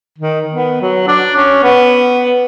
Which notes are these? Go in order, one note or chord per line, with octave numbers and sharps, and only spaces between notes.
D#3
B3
F#3
D4
C#4
B3